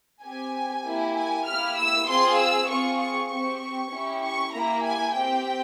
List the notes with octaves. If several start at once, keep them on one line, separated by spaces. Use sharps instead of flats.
C4 G4 G#5
A#3 E4 G4
G#5
A#3 E4 G4 F6
E6
C4 F4 G#4 C6
E6
C4 F4 G#4 C#6
C#6
C4 G4 C#6
C#4 E4 G4
C#6
A#3 E4 G4 A#5
G#5
C4 G4 G5